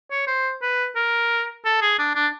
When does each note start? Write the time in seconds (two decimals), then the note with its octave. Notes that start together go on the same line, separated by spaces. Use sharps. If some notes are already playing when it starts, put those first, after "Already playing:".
0.11 C#5
0.27 C5
0.62 B4
0.96 A#4
1.65 A4
1.82 G#4
1.99 D4
2.15 D4